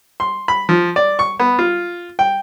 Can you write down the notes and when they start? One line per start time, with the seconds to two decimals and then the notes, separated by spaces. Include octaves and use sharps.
0.20 C6
0.48 B5
0.69 F3
0.96 D5
1.19 C#6
1.39 B3
1.59 F4
2.19 G5